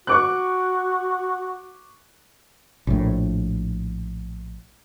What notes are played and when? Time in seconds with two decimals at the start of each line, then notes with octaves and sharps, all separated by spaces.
0.07 F#4 C#6 D6 F#6
2.87 A#1 A2